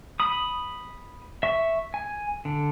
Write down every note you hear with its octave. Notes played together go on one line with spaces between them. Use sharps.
B5 D#6
E5 C#6
G#5
D3